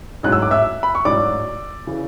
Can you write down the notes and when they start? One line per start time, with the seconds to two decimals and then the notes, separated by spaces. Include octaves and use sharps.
0.23 A1 G#2 F#3 F#6
0.32 E6
0.42 D6
0.51 E5 E6
0.83 B5
0.95 C#6
1.05 A1 G#2 F#3 D5 D6
1.87 C#3 E3